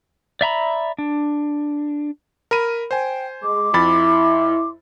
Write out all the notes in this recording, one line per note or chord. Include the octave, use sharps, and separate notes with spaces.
D5 E5 A#5 B5
D4
A#4 B5 D#7
C5 G5 G#5
G#3 C6 D6
F2 E4 B5 A6